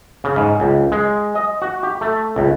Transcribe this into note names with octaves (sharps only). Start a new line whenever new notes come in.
C#3
G#2
C#2
G#3
D#5
F#4
G4
A3
C#2